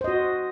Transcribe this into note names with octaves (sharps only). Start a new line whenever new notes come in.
F#4 C5 D#5